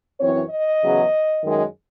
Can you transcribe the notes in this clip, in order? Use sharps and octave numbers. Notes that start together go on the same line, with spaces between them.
F#2 E3 C4 C#5
D#5
E2 C#3 F#3
F#2 D#3 G#3